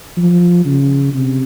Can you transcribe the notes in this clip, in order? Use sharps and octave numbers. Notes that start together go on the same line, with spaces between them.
F3
C#3
C3